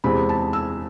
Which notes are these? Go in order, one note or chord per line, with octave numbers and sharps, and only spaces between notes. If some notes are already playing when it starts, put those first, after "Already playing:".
E2 C3 G#3 C4 B5
A5
E6